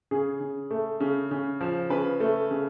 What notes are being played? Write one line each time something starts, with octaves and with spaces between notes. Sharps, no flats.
C#3 G#4
C#3
A3
C#3
C#3
F3
C#3 B4
A3
C#3